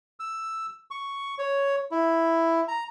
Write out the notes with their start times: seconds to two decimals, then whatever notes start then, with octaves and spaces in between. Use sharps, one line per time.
0.20 E6
0.91 C#6
1.39 C#5
1.92 E4
2.68 A#5